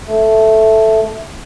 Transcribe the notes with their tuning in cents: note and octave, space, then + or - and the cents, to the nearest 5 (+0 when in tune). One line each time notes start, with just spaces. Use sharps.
A3 +0